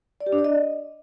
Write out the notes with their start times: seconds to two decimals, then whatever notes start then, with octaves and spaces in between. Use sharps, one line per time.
0.20 D5
0.26 G4
0.32 D4
0.38 D5
0.44 D#5